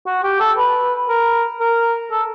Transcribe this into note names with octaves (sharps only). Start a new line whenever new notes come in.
F#4
G4
A4
B4
A#4
A#4
A4